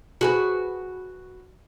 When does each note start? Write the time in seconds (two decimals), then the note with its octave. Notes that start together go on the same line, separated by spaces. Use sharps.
0.21 F#4 G#4 B4